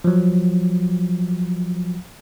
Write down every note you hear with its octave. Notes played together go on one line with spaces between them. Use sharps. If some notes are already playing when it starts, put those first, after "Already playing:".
F3 F#3